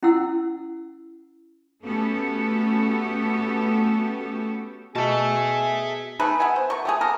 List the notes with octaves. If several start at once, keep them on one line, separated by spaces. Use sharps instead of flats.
C#4 E4 F#5 E6
A3 B3 C#4 F#4 G4 A4
B2 G#4 E5 A5
A3 D#4 G#4 B4
B3 E5 F#5 G#5
C5
B2 A#4 C#6
A3 G4 G#4
A#3 B3 A4 A#4